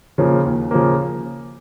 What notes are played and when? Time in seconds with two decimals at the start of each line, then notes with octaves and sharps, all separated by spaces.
0.18 C#3 F3 A#3
0.45 D#2
0.71 C#3 F3 A#3